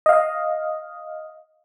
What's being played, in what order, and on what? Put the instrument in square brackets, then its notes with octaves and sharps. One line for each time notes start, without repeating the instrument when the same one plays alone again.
[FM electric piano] D#5 F5